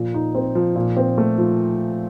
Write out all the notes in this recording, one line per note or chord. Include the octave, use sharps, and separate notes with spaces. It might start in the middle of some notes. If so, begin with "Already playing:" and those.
Already playing: A#2 F3
D#4
C4
F3
A#2
C4
A3
F3